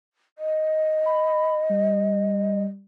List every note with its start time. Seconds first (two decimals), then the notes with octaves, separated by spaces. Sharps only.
0.38 D#5
1.06 B5
1.70 G3